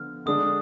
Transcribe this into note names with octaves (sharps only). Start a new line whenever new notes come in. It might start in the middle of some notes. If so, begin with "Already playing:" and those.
Already playing: D3 F3 B3 F6
D3 G#3 D4 D#6